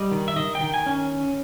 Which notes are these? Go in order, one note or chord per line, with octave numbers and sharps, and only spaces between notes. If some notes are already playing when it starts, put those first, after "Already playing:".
Already playing: G3 D#5
D#3
E5
D#3 D#5
G5
D#3
G#5
C#4